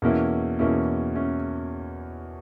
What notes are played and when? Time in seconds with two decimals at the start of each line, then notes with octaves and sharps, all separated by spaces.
0.02 E2 B2 A#3 C#4 E4
0.59 E2 B2 A#3 C#4 E4
1.15 C#4 E4